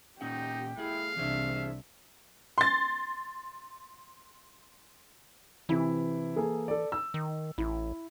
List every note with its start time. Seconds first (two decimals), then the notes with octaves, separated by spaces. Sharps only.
0.21 A#2 C#4 D#4 G4 F#5
0.78 A3 E4 G#4 F5
1.17 C2 C3 E3 D4 G#4 C5 E5
2.58 C6 A6
5.69 C3 E3 E4
6.36 A#3 G#4 A4
6.68 A4 D5
6.92 E6
7.14 D#3
7.58 A1 E4